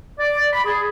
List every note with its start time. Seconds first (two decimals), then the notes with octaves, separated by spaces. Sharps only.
0.19 D5
0.52 B5
0.65 G#4